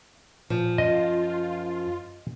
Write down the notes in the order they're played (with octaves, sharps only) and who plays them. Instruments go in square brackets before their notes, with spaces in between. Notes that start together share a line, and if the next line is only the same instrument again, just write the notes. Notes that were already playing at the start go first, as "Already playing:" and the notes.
[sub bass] A#2 [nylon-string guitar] F3
[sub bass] F#2 [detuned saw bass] F4 [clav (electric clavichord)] D#5